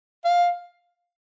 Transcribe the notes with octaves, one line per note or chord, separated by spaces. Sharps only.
F5